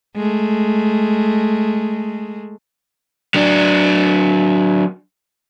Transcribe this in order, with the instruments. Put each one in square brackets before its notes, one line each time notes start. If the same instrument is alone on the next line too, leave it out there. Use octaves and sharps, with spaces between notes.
[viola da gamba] G#3 A3
[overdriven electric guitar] F#3 D4